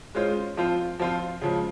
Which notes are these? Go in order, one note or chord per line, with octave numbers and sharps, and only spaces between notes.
G#3 C#4 F4 C5
F3 C4 F4 C5
F3 C4 F4 C5
C#3 F3 G#3